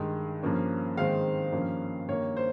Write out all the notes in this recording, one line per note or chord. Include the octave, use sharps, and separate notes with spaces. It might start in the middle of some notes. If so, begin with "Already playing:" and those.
Already playing: G2 D#3 G#3
G2 F3 A#3 C#4
G#2 D#3 G#3 C4 F5
G2 F3 A#3 C#4
G2 D#3 A#3 C#5
C5